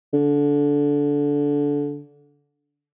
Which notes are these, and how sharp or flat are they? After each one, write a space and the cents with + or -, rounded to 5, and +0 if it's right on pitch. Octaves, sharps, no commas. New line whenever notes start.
D3 -20